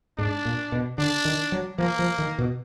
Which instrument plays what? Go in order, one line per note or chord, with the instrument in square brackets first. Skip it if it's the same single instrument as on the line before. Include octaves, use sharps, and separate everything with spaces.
[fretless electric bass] G#2 [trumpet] D4
[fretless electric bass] A#2
B2
[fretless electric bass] D3 [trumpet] D4
[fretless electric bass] D#3
F#3
[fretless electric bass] F3 [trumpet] A#3
[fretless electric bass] F3
D#3
B2